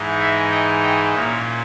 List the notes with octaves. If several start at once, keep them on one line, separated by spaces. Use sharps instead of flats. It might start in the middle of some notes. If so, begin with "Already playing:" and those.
Already playing: G#2 E3 G#3 D#4
E5 G#5
D#5 G5
D#5 G5
A#2 A#3 C#4 C#5 E5